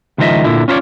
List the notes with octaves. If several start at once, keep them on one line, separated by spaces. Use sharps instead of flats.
C#2 D#3 F3 C5 D#5 E5
A#2 D3 E4
C#4 F4 A#4 B4 C#5 D5